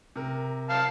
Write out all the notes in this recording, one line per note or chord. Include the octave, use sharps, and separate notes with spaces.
C3 A#4
F5 A5